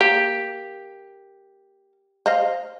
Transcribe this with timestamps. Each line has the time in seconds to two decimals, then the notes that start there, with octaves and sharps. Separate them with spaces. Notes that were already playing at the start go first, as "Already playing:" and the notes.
0.01 A#3 G4
2.26 C5 D#5 F5